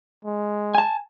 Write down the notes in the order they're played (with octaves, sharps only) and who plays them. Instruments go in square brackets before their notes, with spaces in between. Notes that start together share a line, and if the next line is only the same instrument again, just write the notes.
[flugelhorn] G#3
[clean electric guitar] G#5 A5